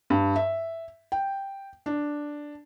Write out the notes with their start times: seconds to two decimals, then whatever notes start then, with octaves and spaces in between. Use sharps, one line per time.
0.10 G2
0.36 E5
1.12 G5
1.86 D4